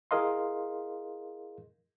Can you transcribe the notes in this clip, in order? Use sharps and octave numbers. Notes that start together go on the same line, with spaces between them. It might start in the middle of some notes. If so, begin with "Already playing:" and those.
E4 G#4 A#4 D#5 F5 C6